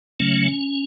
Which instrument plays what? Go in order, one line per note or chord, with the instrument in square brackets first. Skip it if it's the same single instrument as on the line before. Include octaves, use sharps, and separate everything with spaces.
[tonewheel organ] C#3 F#3 A3 C#4